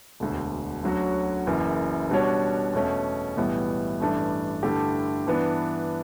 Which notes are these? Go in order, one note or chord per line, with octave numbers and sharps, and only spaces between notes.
E1 D2 D3
D2 D3 F#3 C#4 F#4
F#1 F#2 E3
B2 G3 D4 F#4 C#5
E2 B2 A3 C#4
B1 A2 E3 G3 B3
A1 G2 E3 A3 D4
G2 D3 A3 E4 G4
G2 E3 B3 D4